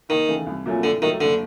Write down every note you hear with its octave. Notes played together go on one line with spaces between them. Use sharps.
D#2 D#3
C#3 E3 A3
C2
A#2 F#3 A3 C#4
A2 D3
D#3 F#3 A3
F#1 D3